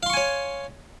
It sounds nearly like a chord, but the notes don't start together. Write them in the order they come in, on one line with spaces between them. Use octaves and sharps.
F5 C6 C#6 G#5 C#5